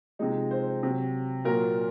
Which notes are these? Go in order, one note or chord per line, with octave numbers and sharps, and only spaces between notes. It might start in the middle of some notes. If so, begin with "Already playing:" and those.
C3 F3 G#3 D#4
C5
C3 F#3
A#2 F#3 A#4